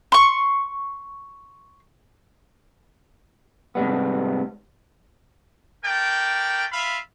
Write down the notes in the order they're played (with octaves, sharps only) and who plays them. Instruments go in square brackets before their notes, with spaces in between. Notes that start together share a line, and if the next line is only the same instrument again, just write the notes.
[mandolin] C6 C#6
[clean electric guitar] G#2 C3 G3 B3
[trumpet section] A3 A#4 D5 G5
F4 E5 F5 B5